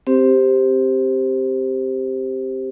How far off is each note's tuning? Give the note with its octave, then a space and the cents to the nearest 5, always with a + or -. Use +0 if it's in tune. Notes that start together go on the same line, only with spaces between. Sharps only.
C4 +0 G4 +0 C5 +0